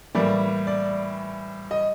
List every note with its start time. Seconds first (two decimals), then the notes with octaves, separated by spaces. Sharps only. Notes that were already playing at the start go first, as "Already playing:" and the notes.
0.15 A2 E3 G3 A#3 D5
0.67 D5
1.71 D#5